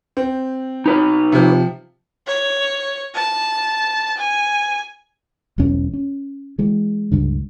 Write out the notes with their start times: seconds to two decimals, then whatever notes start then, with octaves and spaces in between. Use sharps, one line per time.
0.17 C4
0.86 D#4 B4 C#5
1.32 C3 F3
2.27 C#5
3.15 A5
4.17 G#5
5.58 E1 B1 E2 C#4
5.93 C#4
6.59 E3 G#3
7.12 C#2 G2 D3